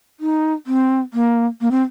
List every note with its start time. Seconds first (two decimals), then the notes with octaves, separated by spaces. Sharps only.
0.20 D#4
0.67 C4
1.13 A#3
1.61 A#3
1.71 C4